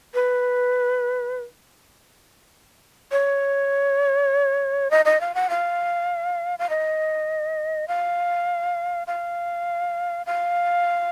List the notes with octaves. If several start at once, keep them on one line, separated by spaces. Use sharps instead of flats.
B4
C#5
D#5
D#5
F5
F#5
F5
F5
D#5
F5
F5
F5